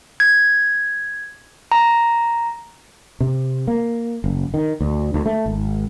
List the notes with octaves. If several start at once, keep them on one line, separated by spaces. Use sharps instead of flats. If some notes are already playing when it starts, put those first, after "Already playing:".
G#6
A#5
C3
A#3
F#1
D#3
D2
D2
A3
G#1